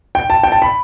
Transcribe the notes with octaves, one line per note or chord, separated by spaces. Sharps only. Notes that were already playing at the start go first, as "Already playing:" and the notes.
G5
A5
G5
A5
B5